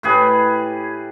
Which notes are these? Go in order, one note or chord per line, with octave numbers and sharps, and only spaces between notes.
A2 G4 G#4 B4